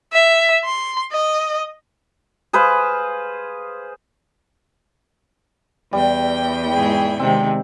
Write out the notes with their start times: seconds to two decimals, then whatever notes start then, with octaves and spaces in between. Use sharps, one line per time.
0.13 E5
0.64 C6
1.12 D#5
2.53 G#4 B4 C5 F5
5.93 E2 G3 G5
6.74 G#2 E4 G#4
7.19 C3 D#3 G#3 C4